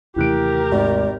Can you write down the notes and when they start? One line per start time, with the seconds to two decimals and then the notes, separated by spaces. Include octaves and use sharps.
0.16 D#2 C3 E3 A3 G4 A#4 F#6 D7
0.72 G#1 D5